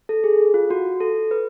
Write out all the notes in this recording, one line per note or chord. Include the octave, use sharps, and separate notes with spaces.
A4
G#4
F4
F#4
A4
B4